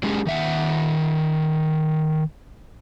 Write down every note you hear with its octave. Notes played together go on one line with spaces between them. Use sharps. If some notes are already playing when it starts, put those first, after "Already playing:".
F#3 G#3 A3 C#4 G4 G#4
D#3 E5 F#5